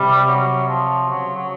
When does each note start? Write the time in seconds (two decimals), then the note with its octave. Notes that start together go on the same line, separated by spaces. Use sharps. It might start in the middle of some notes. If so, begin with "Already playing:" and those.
Already playing: C3 G3
0.28 F#3
0.68 F3
1.09 C#3 F#3
1.36 F#3